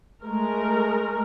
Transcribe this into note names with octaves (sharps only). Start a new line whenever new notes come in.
G#3 A3 A#4